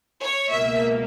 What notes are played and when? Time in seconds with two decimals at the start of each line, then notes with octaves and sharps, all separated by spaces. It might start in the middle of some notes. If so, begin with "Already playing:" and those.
0.22 C#5
0.50 C#2 B2 A#3 E5